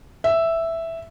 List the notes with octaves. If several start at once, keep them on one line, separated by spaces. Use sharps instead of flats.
E5